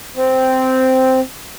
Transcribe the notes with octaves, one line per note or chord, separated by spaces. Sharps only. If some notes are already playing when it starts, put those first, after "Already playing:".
C4